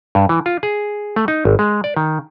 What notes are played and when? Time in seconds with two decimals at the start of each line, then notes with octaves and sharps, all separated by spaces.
0.15 G2
0.29 E3
0.46 F4
0.63 G#4
1.16 A3
1.28 D#4
1.45 G#1
1.59 G#3
1.84 D5
1.97 D#3